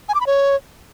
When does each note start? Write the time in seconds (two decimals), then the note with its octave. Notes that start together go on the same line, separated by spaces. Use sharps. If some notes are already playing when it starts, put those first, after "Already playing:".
0.09 G#5
0.15 D6
0.21 B5
0.27 C#5